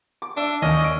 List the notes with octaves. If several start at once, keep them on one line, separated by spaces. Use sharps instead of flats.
D6
D4 E5
D#2 C#4 D#5
D7